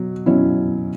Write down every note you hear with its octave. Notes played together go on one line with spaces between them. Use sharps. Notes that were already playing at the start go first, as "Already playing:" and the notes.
Already playing: B2 F#3
B2 F#3 C#4 E4